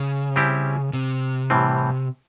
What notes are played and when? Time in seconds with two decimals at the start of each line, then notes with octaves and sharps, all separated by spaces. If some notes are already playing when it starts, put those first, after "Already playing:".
Already playing: C#3
0.36 G3 C4 E4 G4
0.93 C3
1.50 A2 E3 G3 C4